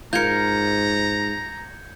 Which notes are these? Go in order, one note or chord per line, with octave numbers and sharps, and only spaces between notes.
G#2 F4 A#4 A#5 G6 G#6 C#7